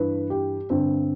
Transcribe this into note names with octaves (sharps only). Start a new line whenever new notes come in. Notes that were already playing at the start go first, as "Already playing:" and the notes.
Already playing: G2 E3 B4
G4
G2 D3 C4